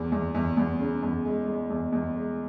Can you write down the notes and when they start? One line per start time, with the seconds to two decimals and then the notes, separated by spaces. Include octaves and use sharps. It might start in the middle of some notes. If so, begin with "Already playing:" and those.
Already playing: E2
0.12 E2
0.34 E2
0.57 E2
0.80 C#3
1.02 E2
1.25 G#3
1.47 G#3
1.70 E2
1.92 E2
2.15 G#3